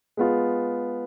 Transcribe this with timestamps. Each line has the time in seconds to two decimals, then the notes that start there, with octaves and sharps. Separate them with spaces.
0.17 G#3 B3 F4